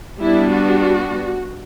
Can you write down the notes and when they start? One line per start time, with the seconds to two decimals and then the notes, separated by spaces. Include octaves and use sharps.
0.21 G3 B3 D4 E4
0.52 F#4